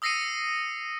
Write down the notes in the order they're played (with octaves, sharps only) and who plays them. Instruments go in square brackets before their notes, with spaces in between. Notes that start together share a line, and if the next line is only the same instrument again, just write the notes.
[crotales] D#6 E6 A#6 C7 C#7 D#7